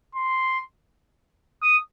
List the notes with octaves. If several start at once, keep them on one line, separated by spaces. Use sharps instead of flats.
C6
D#6